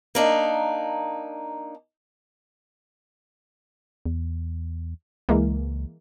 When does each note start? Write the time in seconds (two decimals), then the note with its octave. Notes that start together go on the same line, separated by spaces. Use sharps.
0.15 A#3 D4 D#4
4.06 E2
5.29 C#2 E3 G#3 A#3